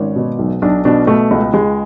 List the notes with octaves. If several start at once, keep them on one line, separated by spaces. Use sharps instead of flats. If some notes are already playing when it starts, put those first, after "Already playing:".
Already playing: G#1 C#4
B2
B1
B1 D4
B2 D4
B2 A3
C#2
C#2 G#3